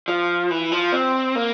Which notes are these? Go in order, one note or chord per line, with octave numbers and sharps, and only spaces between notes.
F3
E3
F3
C4
A#3